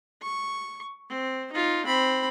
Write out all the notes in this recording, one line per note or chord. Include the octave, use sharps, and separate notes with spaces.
C#6
C4
D#4 F4
C4 B5